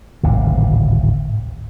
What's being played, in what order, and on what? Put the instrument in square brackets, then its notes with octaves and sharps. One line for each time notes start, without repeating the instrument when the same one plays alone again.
[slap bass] D1 G#1 C3